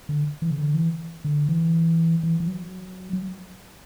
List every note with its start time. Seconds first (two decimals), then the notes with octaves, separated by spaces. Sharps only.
0.09 D3
0.42 E3
0.51 C#3
0.58 D3
0.74 E3
1.25 D3
1.49 E3
2.23 E3
2.40 E3
2.48 F#3
3.13 F#3